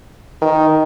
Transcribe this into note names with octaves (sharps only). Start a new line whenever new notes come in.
D#3